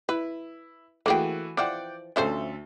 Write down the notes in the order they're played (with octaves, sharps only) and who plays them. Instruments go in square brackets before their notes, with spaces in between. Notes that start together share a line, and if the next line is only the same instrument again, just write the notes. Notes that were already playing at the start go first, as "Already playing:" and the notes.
[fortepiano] E4 [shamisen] B4
[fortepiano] E3 A3 F#4 [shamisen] A#3 G#4 G5
[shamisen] E3 F3 [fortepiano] D5 F#5 G5
[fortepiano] D2 A4 E5 [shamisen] F3 C#4 C5